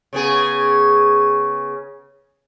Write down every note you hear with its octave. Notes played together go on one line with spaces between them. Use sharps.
C#3 B3 G#4